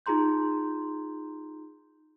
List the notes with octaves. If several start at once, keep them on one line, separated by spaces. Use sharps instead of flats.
D#4 F4 G#4 A#5 C6 G6